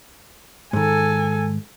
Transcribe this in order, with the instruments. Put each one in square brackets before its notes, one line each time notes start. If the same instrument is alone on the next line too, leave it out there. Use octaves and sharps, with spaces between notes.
[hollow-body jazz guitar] G#2 D#3 [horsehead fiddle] A4 G#5